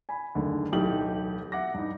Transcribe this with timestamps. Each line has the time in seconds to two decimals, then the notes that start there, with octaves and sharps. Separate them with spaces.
0.09 G#5 B5
0.35 F#1 D2 D3 D#3
0.72 D1 B1 E3 D#4 G4 F#7
1.52 E5 F#5 D6 A#6
1.74 G2 D#4